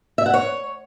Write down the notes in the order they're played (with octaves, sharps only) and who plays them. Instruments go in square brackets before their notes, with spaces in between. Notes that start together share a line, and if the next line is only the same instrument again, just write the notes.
[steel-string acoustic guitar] E5
F#5
C#5